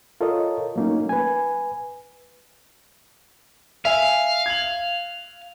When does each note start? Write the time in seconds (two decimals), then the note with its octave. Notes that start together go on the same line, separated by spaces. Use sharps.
0.21 F4 A4 A#4 C#5 D#5
0.76 F#3 A3 A#3 C#4 D#4
1.09 B4 G#5
3.85 E5 F5 G#5
4.46 G#6 F#7